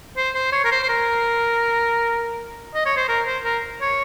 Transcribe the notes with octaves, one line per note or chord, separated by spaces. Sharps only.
C5
C5
C#5
A#4
C5
C5
A#4
D#5
C#5
C5
A#4
C5
A#4
C#5